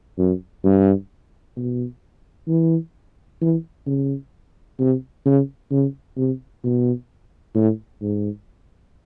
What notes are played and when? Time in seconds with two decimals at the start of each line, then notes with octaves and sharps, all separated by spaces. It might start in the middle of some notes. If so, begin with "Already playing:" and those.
0.18 F#2
0.64 G2
1.57 B2
2.48 E3
3.41 E3
3.86 C#3
4.79 C3
5.25 C#3
5.71 C#3
6.17 C3
6.64 B2
7.55 A2
8.02 G#2